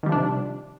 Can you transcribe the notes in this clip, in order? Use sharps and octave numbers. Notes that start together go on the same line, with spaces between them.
C3 D#3 F3 G3 D4